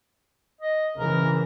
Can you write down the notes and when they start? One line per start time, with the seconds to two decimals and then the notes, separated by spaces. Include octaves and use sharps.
0.61 D#5
0.96 C#3 E3 A#4